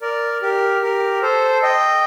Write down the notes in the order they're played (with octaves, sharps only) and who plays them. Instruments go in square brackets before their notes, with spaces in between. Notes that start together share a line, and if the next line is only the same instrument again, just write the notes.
[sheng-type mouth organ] A#4 D5
G4 A#4
G4 A#4
A4 C5
D#5 G5